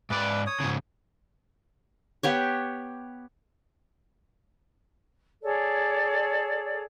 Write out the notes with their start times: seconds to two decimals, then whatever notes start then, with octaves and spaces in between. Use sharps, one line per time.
0.10 G#2 B4 D5
0.47 C#5 D#6
0.60 G#2 C#3
2.23 B3 G4 C#5
5.43 G#4 A4 C#5 D5